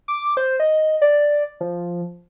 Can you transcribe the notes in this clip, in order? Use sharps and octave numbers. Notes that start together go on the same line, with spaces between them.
D6
C5
D#5
D5
F3